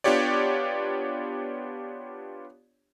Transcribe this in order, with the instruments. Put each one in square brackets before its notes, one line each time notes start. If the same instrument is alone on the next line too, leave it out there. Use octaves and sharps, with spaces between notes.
[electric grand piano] B3 D4 F4 G4 C#5 D5